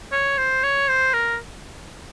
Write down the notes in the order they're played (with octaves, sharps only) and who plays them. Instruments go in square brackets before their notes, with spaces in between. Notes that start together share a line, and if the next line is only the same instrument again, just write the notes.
[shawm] C#5
C5
C#5
C5
A#4